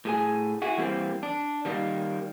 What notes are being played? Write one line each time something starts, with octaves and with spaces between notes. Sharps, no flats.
A2 G#4 G#5
E4 F#4 G#4
E3 G3 A#3 C4
D4
D#3 G3 A#3